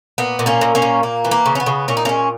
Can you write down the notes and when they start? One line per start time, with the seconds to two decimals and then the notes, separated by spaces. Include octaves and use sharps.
0.18 A#2 B3
0.39 A#2
0.46 A#3 C#4
0.61 A#2
0.75 A#3 C#4
0.82 A#2
1.03 A#3
1.25 E3
1.31 A#3
1.46 C#3
1.55 C#4
1.60 B3
1.66 C#3
1.88 A#2 C#4
1.97 D#4
2.05 G#3 A#3 C#4